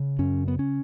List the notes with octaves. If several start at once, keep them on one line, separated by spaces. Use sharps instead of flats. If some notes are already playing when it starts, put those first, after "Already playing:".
Already playing: C#3
F#2 C#4
B3
C#4